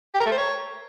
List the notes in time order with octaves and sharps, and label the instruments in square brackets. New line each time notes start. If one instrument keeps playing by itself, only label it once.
[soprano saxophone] G4
A#4
A3
C5
C#5